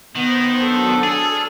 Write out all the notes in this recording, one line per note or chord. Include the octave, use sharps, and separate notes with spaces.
D#3 B3 C5
F#3 D4 A4
G#4 F6